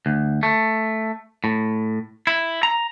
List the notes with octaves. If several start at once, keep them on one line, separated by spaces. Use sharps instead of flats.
D2
A3
A2
E4
A#5